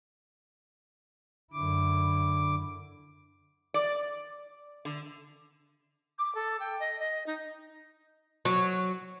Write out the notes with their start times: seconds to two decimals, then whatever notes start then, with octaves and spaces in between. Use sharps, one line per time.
1.53 F#2 D3 E4 D6
3.74 D5
4.85 D3
6.19 D6
6.35 A4
6.60 G5
6.80 D#5
6.99 D#5
7.27 D#4
8.45 F#3